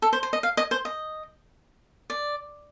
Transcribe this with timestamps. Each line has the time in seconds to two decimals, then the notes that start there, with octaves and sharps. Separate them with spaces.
0.02 A4
0.13 C5
0.23 C5
0.33 D#5
0.43 F5
0.57 D#5
0.71 C5
0.85 D#5
2.10 D5